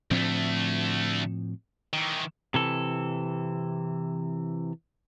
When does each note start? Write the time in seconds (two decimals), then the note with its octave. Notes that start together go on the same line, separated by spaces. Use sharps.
0.11 D2 A2 F3 A3 C4
1.93 D#3 E3
2.54 C3 E3 A4